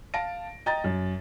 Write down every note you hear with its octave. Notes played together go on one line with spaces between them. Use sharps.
F5 A5 A#6 D7
D#5 G5 A#5 A6
F#2